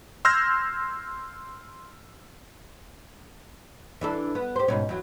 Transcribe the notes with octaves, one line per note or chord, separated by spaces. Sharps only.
C6 E6 F6 G6 G#6 A#6
E3 D4 A4
B3
G4 C5
G#2 B2 C#4
E2 F#3